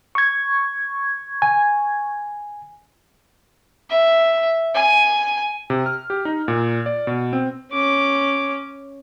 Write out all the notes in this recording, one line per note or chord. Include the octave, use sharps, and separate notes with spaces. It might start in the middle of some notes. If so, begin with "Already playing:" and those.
C#6 G#6
G#5
E5
G#5
C3
F6
G4
D#4
A#2
D5
B2
C4
C#4 D6